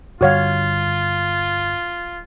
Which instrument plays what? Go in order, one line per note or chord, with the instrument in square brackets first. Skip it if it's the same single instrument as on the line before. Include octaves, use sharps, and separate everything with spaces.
[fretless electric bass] G2 D3 G3 [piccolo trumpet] F4 [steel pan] F#4 C#5 F5